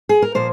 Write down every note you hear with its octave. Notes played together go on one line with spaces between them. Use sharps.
G#4
A#4
A#2 F3 A#3 C5